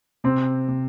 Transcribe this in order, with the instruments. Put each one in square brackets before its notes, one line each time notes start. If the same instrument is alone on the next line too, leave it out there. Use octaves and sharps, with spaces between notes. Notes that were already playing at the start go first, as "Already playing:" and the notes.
[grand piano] C3 [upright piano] C4
[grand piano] C3